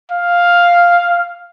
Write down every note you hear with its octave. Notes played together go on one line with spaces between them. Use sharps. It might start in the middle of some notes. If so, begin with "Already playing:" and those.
F5